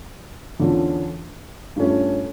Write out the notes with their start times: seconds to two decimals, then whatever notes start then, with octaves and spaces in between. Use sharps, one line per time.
0.60 E2 D3 F3 C#4
1.76 G2 F3 A3 C#4